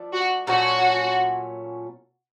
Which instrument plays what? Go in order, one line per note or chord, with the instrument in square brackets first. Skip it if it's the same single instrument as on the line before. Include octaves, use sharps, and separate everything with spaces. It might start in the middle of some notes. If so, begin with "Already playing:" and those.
Already playing: [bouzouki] F3 A3 D4
[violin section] F#4
[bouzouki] A#2 F#3 A3 C#4 [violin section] F#4